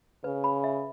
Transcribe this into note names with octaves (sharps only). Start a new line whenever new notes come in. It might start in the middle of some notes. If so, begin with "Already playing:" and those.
C#3 B4
B5
E5